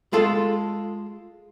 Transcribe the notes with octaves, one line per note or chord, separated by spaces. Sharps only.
G#3 F4 A4